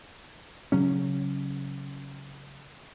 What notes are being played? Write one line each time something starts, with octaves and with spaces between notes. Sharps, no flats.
C#3 F#3 C#4